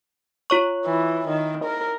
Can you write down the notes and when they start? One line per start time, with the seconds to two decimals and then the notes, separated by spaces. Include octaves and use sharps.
0.50 F4 C#5 C#6
0.86 E3
1.28 D#3
1.65 A#4